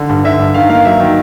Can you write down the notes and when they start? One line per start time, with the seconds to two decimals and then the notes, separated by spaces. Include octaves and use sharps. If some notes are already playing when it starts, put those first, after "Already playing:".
Already playing: D3
0.09 G2
0.24 D3 E5
0.40 G2
0.54 D#3 F5
0.69 A#3 F5
0.85 F#3 E5
1.00 D#3